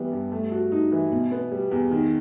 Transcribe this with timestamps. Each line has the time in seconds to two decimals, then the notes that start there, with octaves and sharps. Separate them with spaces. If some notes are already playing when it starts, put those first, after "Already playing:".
Already playing: E3 G3 B3
0.12 G2
0.32 A3
0.52 F#4
0.72 D#4
0.92 E3
1.12 B2
1.32 B3
1.52 G3
1.71 E2
1.91 D#3